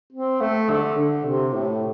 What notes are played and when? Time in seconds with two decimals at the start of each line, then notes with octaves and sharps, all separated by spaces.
0.13 C4
0.41 A3
0.70 D3
0.97 D3
1.26 C3
1.53 A2